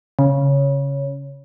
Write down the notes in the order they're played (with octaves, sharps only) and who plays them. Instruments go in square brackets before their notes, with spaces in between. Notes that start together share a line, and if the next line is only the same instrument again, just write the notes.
[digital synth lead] C#3